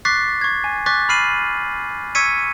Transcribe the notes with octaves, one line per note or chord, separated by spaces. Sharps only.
C#6 D6 F#6 A6 B6 C7
C#6 G#6
G#5
C#6 D6 F#6 A6 B6
B5 F6 C7 D#7 F#7
C#6 E6 G#6 B6 C#7 D#7